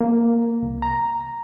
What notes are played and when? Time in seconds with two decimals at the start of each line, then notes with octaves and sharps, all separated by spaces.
0.01 A#3
0.62 C2
0.82 A#5